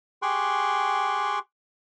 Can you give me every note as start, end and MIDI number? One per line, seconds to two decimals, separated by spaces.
0.22 1.39 67
0.22 1.39 68
0.22 1.39 79
0.22 1.39 84
0.22 1.39 85
0.22 1.39 90